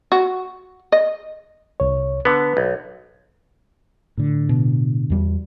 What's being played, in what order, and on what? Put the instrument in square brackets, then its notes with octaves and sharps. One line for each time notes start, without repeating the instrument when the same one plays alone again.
[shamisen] F#4
D#5
[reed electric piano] C2 C#5
[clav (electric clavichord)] D3 B3 [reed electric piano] B4
[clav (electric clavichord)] B1
[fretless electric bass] A2 D3
[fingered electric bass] B2
E2 G3